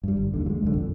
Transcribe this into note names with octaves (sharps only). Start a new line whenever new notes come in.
G2 G3
G1
D#2 D3
F#3 G#3
C2 F#2 D3
G1 F2